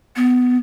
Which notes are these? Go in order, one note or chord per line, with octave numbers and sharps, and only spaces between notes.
B3